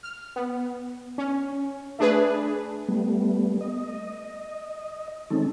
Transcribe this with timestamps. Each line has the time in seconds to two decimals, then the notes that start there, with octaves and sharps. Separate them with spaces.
0.03 F6
0.36 B3
1.18 C#4
1.99 A3 D4 G#4 B4
2.89 G3 A3 B3
3.61 D#5
5.30 D#3 G#3 C4 C#4 D#4 A4